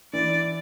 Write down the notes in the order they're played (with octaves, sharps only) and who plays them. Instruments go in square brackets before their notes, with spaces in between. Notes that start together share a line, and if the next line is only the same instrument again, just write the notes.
[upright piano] E3 [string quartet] D5